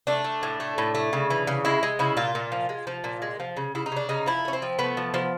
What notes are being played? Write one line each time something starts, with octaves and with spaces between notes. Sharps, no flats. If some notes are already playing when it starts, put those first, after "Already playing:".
A3 D4
A3
A2
A3
A2
A3
C#3
E3
C#3
G#3 E4
G#3
C#3 E4
A#2 F4
A#2
F3
G#3
F3
A#2
G#3
F3
C#3
C#3 E4
D#4
C#3 D4
C#3 D#4
F3 E4
A3
C#4
C4
F3
A3 B3
F3
F3